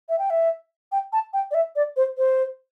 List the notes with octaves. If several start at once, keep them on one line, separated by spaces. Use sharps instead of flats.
E5
G5
E5
G5
A5
G5
D5
E5
D5
C5
C5